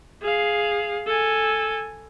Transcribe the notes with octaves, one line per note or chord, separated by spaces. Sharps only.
G#4 F5
A4 G#5